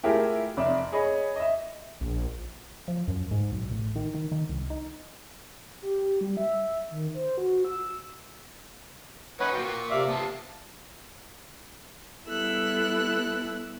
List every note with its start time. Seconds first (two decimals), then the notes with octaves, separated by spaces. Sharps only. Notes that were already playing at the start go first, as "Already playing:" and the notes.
0.03 A3 E4 F4 G4 G#4 A#4
0.57 F1 D5 E5
0.92 G#4 C#5 D#5 B5
1.36 D#5 E5
2.01 A#1
2.88 F3
3.08 F#2
3.31 G#2
3.52 B1
3.71 A1
3.96 D#3
4.14 D#3
4.32 D#3
4.49 C2
4.70 D#4
5.82 G4
6.21 G3
6.37 E5
6.91 D#3
7.14 C5
7.38 F#4
7.65 E6
9.40 C#4 D#4 B4 C#5 F#5
9.53 A#3 F4 F#4 G5
9.65 C#6
9.90 C3 D5 E5 F5
10.09 B3 F4 A5
12.29 G3 B3 E4 A4 E6 F#6